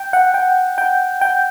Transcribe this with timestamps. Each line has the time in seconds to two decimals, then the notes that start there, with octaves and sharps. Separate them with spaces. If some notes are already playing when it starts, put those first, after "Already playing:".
Already playing: G5
0.13 F#5
0.34 G5
0.78 G5
1.21 G5